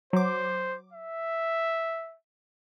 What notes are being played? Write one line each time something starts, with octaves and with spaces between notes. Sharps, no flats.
F#3 C5 D6
E5